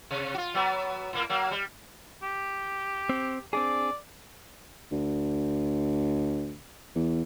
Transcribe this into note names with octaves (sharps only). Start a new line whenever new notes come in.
C3
F4 F#4
F#3 B3
A2 A#3
F#3 A#3
G3
G4
C4
C4 D4 G#4 D5
D2
E2